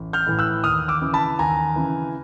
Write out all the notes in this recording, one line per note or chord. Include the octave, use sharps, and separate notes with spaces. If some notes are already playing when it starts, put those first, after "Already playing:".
Already playing: A1
F6 G6
A2 E3
E6 F#6
D#2 D#6 F6
D6 E6
C#3 E3
A5 B5
D#2 G#5 A#5
C#3 E3